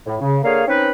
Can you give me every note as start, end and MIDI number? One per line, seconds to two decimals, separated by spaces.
0.06 0.16 45
0.21 0.39 49
0.44 0.62 50
0.44 0.62 58
0.44 0.62 68
0.44 0.62 73
0.44 0.62 77
0.68 0.91 60
0.68 0.91 61
0.68 0.91 63
0.68 0.91 71